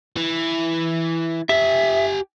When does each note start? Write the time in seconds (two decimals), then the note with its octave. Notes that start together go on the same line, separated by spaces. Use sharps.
0.16 E3
1.49 G4 E5 G#5